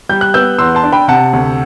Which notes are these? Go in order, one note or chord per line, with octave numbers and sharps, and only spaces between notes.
G3 G6
F#6
B3 E6 G6
E2 C6 E6
A5 C6
D4
G5 B5
C3 F#5 A5
D2